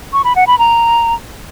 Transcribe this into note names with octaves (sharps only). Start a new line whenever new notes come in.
C#6
B5
F#5
B5
A#5